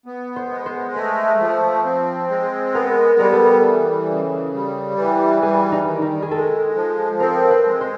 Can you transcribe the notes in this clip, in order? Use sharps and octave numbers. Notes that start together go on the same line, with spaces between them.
B3
C5
G#3
C5
A3 B4
F3
C4
G#3
B3 A#4
G3 A#4
A4
A#4
E3 A4
C#3
G3
E3
G3 G#4
D#4
D#3
D#4
G#4
G#3 A4
F3
C4 A#4
B4
G#3
C5